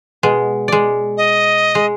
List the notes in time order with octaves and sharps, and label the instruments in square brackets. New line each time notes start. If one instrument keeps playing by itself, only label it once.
[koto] B2 G#3
G#3 D5
[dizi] D#5
[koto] G#3